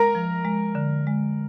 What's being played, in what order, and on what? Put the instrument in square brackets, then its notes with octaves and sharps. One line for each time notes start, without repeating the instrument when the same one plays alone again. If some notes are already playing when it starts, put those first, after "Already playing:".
Already playing: [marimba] G#3 [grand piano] A#4 A#5
[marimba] F3
G#3
D3
G#3